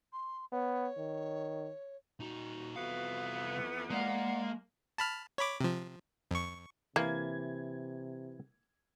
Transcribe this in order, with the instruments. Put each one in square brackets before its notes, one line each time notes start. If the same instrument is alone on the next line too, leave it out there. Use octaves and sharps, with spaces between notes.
[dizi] C6
[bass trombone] B3 [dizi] C#5
[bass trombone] D#3
[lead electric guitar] A#2 D#4 [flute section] F#4
[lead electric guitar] C2 F5 [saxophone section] F2 E3 B3
[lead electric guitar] G#3 [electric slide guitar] A#3 F5 [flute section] D5 F#5
[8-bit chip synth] A5 B5 F6
C#5 B5 D6
C3 F3
F2 C#6
[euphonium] C3 [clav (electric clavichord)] E3 [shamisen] A#3 [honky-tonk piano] G#6